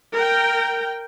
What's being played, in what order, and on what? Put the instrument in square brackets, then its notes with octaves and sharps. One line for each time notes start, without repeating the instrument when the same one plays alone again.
[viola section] A#4 G5